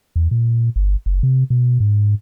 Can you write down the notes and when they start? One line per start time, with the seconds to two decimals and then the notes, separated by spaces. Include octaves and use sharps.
0.16 E2
0.31 A#2
0.76 G1
1.06 F#1
1.23 C3
1.50 B2
1.80 G#2